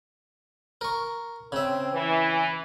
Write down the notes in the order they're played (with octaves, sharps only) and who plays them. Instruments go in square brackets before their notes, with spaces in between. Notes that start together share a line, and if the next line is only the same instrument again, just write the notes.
[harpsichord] A#4 C#6
[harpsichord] C#3 E5 [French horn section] C4
[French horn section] E3